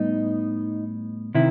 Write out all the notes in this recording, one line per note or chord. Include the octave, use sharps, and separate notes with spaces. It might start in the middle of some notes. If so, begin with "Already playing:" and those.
Already playing: A2 G3 B3 D#4
C3 D#3 E4